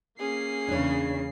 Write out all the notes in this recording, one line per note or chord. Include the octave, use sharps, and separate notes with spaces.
A#3 C#4 G#4 C7
E2 C#3 D4 C#5